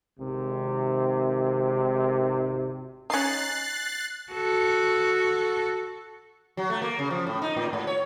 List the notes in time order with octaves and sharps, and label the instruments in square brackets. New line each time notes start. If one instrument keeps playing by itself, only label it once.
[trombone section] G#1 C3
[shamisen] C#4 D#4 [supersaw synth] F#6 A6 C7
[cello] F#4 A4
[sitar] F#3
A3
A#3
C#3
F3
A2
D#4
A2
G#2
C#5